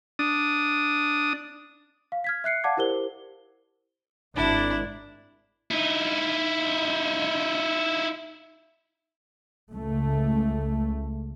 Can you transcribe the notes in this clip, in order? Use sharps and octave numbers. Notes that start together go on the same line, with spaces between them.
D4 D#6
F5
F6 G#6 B6
E5 F#6 C7 C#7
D5 F5 F#5 A5 D6 G#6
E4 G4 A#4 C5 G7
G#1 D4 E4
D#4 E4
C#2 A3